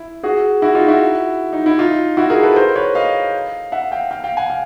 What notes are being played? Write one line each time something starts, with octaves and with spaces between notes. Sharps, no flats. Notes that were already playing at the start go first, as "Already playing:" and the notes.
Already playing: E4
F#4 G#4
E4 F#4
D#4 F4
E4 F#4
D#4
E4
D#4 F4
E4 F#4
G#4 A#4
A4 B4
A#4 C5
B4 C#5
D#5 F5
E5 F#5
F5 G5
F5 G5
F5 G5
F#5 G#5
F5 G5